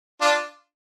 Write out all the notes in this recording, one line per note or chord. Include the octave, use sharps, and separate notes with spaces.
D4 F4